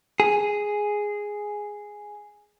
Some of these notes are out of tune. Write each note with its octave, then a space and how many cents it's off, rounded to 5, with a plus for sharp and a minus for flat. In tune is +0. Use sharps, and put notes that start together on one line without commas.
G#4 +0